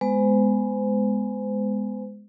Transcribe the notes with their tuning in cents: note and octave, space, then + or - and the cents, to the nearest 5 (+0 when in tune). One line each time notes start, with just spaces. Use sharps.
G#3 +0 B3 +0 C5 -35